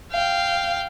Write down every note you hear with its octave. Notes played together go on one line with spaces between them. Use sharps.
F5 G5